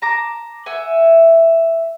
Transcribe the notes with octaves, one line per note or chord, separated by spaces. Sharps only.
A5 A#5 D6
E5 F#5 G#5